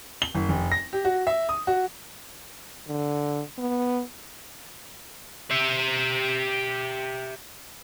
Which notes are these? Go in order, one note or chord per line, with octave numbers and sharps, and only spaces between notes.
G7
F#1
F1
A#6
G4
F#4
E5
D#6
F#4
D3
B3
G4 E5